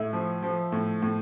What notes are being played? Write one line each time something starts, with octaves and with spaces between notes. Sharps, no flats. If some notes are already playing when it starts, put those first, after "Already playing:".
Already playing: A2 E5
F3
F3
A2
A2